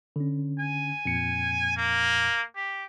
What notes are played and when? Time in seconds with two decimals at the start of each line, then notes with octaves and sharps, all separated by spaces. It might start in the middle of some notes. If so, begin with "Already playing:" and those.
0.16 D3 C#4
0.60 G#5
1.05 F2 A#2 C#7
1.77 A#3
2.56 G4